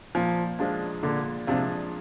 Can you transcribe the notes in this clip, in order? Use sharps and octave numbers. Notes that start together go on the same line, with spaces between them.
A#2 F3
F3 G#3 D4 F4
A#2 D3
C3 F3 G#3 D4 F4